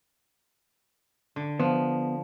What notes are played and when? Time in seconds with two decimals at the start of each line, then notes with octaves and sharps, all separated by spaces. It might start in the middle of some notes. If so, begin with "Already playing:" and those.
1.36 D3
1.60 F3 B3